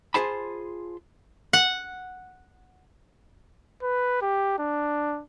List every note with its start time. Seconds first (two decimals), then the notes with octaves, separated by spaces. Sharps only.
0.14 F4 G4 G#4 C5 A5 B5
1.53 F#5
3.82 B4
4.22 G4
4.58 D4